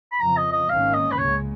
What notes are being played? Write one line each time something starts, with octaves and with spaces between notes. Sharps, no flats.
B5
F2 C#3 F3 A#5
D#5
D#5
G#1 G#2 D#3 A#3 C#4 F5
D#5
B4
C#2 C#3 G#3 C#5